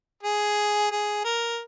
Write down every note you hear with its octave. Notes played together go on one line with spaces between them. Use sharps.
G#4
G#4
A#4